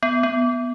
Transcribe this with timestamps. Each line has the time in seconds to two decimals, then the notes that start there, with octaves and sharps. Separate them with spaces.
0.03 B3
0.23 B3